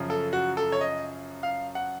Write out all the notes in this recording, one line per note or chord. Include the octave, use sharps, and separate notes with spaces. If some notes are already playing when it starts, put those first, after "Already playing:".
Already playing: F#2 C#3 F3
A4
F#4
A4
C#5
D#5
F5
F#5